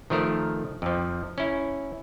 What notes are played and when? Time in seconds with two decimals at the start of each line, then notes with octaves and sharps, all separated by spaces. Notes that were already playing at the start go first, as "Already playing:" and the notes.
0.10 D#3 F3 A3 A#4
0.82 F2 F3
1.38 C#4 E4